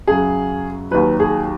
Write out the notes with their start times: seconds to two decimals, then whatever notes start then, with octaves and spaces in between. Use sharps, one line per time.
0.08 F#2 C#3 F#3 G#4
0.91 D#2 D#3 F#3 B4
1.20 G#4